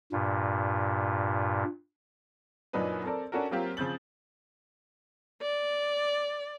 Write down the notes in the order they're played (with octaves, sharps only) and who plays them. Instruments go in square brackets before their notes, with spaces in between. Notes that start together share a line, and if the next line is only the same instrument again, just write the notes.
[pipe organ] G2 A#2
[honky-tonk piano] F#2 A#2 F#3 D4 D#4 B4
C4 A4 A#4 D5
C#4 D4 F#4 A4 A#4
F#3 A#3 C4 F4 G4
C#3 F3 C4 G6 A6 F#7
[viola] D5